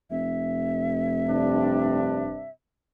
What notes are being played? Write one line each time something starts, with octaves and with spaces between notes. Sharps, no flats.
F1 E5
G2 C3 D4